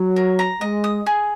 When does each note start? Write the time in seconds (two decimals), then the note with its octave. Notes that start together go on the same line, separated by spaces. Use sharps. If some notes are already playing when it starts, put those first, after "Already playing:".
Already playing: F#3
0.16 A#4
0.39 A#5
0.61 G#3 D#5
0.84 D#6
1.06 G#4